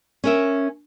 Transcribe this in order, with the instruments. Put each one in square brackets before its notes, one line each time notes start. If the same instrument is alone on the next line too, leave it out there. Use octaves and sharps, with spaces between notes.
[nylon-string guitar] C#4 A#4 E5